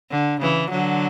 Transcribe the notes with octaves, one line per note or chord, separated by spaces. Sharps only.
D3
C#3 E3
D3 F#3